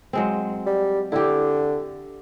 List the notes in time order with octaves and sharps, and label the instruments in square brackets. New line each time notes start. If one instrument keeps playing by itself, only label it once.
[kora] F#3 G#3 C4
[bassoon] G3
[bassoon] D3 [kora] E4 G4